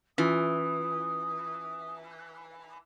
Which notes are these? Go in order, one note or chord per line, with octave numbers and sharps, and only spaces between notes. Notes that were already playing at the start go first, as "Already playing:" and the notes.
E3 C#4 F4 D#6